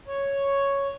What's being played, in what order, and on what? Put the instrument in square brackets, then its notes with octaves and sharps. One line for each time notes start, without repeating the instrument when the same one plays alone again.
[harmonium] C#5